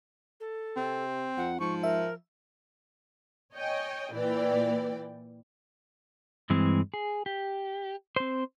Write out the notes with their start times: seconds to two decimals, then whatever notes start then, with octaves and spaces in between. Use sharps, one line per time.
0.40 A4
0.76 C3 C4
1.37 F2 F#5
1.60 G#2 F3 C#6
1.83 A#4 E5
3.54 C#5 D#5 G5 G#5
4.12 A#2 E3 D5 G5
6.50 G2 E3 G#3 C4
6.94 G#4
7.26 G4
8.16 C4 C5